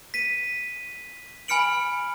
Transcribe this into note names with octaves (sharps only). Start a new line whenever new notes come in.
B6 D#7
G#5 B5 F6 C#7 D7 F#7